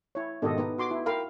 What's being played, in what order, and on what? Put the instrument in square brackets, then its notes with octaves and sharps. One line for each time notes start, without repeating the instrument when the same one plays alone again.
[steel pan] E4 C#5
[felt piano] G#2 B2 D#3 [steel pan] G4 A4 D#5
[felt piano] B3 [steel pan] D#4
[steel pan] F#4 C6 D6
E4
[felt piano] A#4 G5 B5 [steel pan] F5